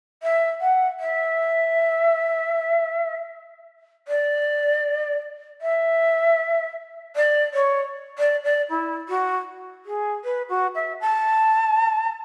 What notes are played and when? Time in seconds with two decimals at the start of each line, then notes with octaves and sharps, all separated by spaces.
0.22 E5
0.60 F#5
0.99 E5
4.07 D5
5.61 E5
7.15 D5
7.53 C#5
8.18 D5
8.43 D5
8.69 E4
9.08 F#4
9.85 G#4
10.24 B4
10.49 F#4
10.75 E5
11.00 A5